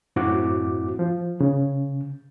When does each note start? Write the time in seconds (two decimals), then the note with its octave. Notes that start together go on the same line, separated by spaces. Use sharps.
0.16 F#2 A2 C4 E4 F#4 D6
0.99 F3
1.41 C#3